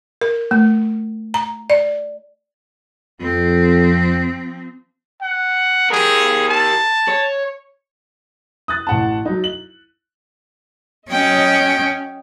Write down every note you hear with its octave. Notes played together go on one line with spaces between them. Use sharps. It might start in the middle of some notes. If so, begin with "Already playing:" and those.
A#4
A3
A#5
D5
F2 F3 C4
F#5
G4 G#4 A#4
A5
C#5
D#6 F#6 A6
A1 F#5 A5
F#3 D#4
F#7
F#3 C#4 D#5 G5